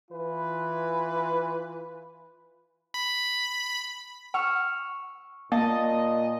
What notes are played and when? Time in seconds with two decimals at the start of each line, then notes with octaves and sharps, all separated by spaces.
0.10 E3 F4 B4
2.94 B5
4.34 F#5 C#6 E6 F6
5.52 A#2 A#3 D#5 A5